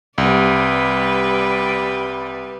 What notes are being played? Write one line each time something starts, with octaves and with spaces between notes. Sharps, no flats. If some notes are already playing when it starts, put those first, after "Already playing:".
C2 G3 B4 D5